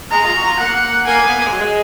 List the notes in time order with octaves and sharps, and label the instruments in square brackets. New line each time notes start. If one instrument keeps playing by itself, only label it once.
[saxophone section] G#3 [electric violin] A#5
[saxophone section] F4
F#4
F4
[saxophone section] A#3 [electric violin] F#5
[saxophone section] A#3 [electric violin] G#5
[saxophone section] B3
A#3
G#3
F#3
G#3